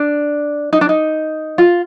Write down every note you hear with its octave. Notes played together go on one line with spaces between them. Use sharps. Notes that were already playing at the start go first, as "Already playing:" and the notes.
Already playing: D4
D#4
D4
D#4
F4